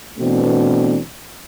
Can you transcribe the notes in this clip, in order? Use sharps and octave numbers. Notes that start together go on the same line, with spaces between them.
B2 E3 A3 B3 C4 D4